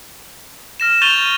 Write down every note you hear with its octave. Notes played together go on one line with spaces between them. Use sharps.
F6 A#6 E7
C#6 G6 A6 D#7 F7 G7